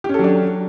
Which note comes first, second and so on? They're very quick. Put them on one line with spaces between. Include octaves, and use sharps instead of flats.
G4 C#4 A4 F#3 D4